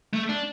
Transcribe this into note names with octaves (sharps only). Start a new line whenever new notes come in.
A3
D4